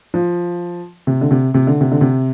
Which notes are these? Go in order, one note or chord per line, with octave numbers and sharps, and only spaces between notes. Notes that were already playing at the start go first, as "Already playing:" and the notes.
F3
C3
D3
C3
C3
D3
C3
D3
C3